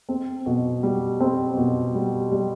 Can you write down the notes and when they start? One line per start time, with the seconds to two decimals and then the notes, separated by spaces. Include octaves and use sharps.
0.09 C4
0.46 B2
0.83 G3
1.20 C4
1.57 B2
1.95 G3
2.32 G3